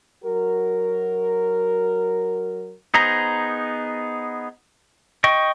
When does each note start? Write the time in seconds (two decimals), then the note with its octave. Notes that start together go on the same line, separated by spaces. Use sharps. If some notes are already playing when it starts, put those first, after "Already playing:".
0.24 F#3 F#4 A#4
2.94 B3 D#4 G#4 C5 A#5
5.24 D#5 G5 C#6